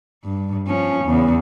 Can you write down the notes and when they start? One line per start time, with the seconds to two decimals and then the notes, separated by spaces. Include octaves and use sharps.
0.25 G2
0.68 F3 C#4
1.05 E2 C#3